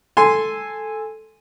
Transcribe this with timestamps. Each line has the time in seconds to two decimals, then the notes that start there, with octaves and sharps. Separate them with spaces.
0.17 A4 G#5 C6